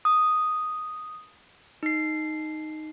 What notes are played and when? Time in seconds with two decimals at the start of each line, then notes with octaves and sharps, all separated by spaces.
0.05 D#6
1.83 D#4 C7